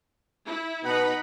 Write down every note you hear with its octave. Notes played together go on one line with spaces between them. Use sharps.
E4
B2 D#4 F#5 B5